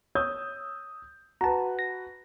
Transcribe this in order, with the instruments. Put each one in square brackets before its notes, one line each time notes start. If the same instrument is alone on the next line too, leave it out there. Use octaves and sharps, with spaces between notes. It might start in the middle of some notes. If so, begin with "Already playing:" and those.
[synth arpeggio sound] C#5 [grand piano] D#6 E6 G6
[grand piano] F#4 B4 [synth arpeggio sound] A5 A#5
[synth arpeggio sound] A#6